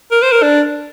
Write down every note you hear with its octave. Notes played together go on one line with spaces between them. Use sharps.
A#4
C5
A#4
D4